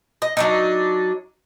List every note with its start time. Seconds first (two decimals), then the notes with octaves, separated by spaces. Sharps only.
0.22 D#5
0.37 F#3 D4 D#4